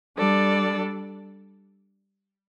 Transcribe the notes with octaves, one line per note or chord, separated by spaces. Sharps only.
G3 D4 A4 D5